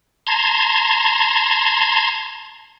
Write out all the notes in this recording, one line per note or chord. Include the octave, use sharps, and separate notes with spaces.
A5 A#5 C6 G#6